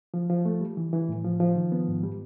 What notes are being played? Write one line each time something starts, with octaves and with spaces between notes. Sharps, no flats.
F3
F3
A3
G3
E3
E3
A2
F3
F3
D#3
B3
G#2
G3